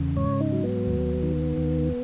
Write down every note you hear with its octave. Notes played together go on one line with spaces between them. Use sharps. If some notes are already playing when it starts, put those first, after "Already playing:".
Already playing: E2 C#3
G#2 C#5
D#4
F#3
B3
D#2
D#3
D#2